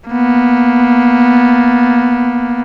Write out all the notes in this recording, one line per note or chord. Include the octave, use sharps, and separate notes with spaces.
A#3 B3